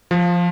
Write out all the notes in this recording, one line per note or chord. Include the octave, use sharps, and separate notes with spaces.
F3